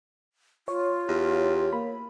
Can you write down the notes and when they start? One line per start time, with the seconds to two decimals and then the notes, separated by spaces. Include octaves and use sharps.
0.68 F4 C#5
1.08 E2 G4
1.73 A#3 B5